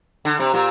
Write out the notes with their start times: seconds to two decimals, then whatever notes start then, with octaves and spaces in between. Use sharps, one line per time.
0.25 D3
0.40 C3
0.54 A#2